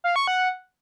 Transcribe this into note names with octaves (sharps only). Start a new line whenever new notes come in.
F5
C#6
F#5